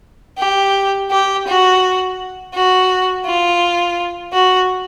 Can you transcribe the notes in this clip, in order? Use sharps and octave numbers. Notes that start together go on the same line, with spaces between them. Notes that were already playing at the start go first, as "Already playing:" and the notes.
G4
G4
F#4
F#4
F4
F#4